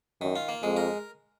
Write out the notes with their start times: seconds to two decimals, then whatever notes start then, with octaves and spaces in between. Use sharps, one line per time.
0.21 F#2 D#3
0.36 F4
0.49 A#3
0.63 F2 G#3
0.77 A#4